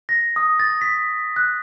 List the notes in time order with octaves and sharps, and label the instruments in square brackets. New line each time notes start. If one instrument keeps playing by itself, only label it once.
[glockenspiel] A#6
D#6
A6
B6
F#6